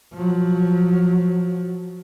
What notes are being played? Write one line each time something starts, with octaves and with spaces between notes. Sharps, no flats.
F3 F#3